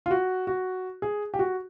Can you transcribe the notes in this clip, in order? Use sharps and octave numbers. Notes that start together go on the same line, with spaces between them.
F4
F#4
F#4
G#4
G4
F#4